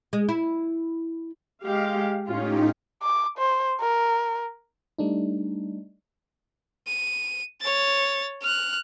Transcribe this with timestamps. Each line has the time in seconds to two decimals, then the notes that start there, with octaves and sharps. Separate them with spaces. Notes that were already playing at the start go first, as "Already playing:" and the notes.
0.13 G#3
0.29 E4
1.65 G#3 G4 F5
2.27 A2 C#4 D#4 F4 G4
3.03 D6
3.37 C5
3.81 A#4
4.98 G3 A3 D4 D#4
6.87 D#7
7.61 C#5 A6
8.43 F6 F#6